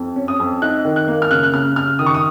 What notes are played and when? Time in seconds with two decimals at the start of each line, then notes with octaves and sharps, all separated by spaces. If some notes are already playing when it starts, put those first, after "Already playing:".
Already playing: F2
0.16 C#4
0.28 D#6
0.40 F2
0.62 D#4 F#6
0.85 D#3
0.96 F#6
1.08 A#3
1.22 F6
1.31 C#3 F#6
1.43 F#6
1.53 C#3 F6
1.76 C#3 F6
1.99 D#3 D#6
2.06 C#6
2.14 D#6